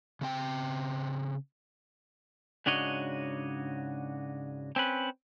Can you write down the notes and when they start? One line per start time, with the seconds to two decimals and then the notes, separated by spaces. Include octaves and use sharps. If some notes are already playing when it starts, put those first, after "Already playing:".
0.21 C#3 C4 G5
2.66 G#2 C#3 D4 F#4 C#5 D#5
4.76 C4 C#4 B4